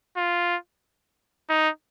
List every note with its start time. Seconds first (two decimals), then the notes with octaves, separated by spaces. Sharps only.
0.17 F4
1.50 D#4